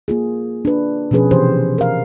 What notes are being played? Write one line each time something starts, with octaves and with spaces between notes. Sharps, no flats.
A#3 F4 G#4
D4 B4
B2 F3 C#4 G#4 B4
C3 E3 G4 C5
A#4 F5